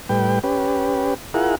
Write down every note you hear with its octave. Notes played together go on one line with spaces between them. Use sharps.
A2 G3 B4 G5
C#4 G4 B4
E4 F4 G#4 A#4 F#5